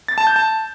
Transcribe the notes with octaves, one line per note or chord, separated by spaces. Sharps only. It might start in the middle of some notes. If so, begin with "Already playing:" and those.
A6
A5
G6
A5